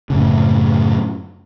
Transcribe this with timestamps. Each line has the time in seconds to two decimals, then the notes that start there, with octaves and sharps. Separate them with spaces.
0.10 F#2 A2 C#3